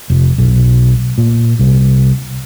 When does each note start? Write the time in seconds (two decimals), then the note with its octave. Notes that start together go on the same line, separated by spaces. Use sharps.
0.10 F1
0.38 B1
1.18 A#2
1.59 C2